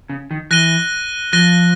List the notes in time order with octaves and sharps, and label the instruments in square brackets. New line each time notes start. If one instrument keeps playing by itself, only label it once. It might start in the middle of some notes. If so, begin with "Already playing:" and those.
[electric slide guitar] C#3
D#3
[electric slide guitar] E3 [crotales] F#6 A#6 D#7 G7
[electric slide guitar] F3 [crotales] F#6 A#6 D#7 G7